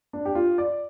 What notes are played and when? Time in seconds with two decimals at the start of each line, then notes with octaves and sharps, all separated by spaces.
0.13 D4
0.25 G4
0.35 F4
0.58 D5